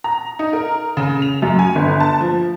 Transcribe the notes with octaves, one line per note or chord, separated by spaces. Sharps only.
A#5
D#4
A#4
C#3
F7
F#2
G#5
G1
A5
F3